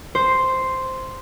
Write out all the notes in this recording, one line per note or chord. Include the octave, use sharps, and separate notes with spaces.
C5